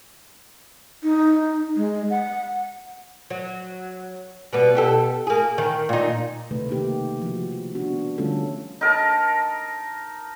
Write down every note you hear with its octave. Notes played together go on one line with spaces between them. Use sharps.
D#4
G#3
F#5
F#3
B2 G3 B3
B2 G4 A4
A#3 G#4
D#3
A#2 D#4
C3 D#3 A3 B4
C#3 A#3 D#4 G4
F3 F#4
B3 D4 F#4
D3 G3 A3 C#4 F4 A4
D#4 A#4 A5